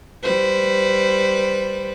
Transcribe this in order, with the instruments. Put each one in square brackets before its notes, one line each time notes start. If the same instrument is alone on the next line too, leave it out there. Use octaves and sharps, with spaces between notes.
[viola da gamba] G3 B4 C5